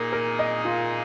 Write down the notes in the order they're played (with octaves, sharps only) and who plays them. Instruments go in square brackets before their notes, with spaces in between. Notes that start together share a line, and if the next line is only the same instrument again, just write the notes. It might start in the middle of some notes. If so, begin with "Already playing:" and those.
Already playing: [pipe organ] A#2 A#3 D#4 G#4 [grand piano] A#4
[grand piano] A#4
D#5
F4